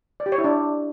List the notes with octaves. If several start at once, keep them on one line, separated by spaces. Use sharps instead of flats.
D5
G4
C#5
E4
D4